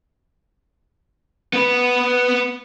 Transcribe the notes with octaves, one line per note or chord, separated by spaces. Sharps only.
B3 B4